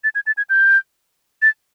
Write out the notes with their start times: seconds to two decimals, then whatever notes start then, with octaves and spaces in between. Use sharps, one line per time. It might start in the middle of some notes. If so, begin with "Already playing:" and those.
0.04 A6
0.15 G#6
0.27 A6
0.37 G#6
0.50 G6
1.42 A6